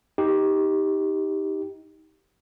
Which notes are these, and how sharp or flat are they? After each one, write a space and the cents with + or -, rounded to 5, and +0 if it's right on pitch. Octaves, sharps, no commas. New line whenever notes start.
D#4 +15 G4 +0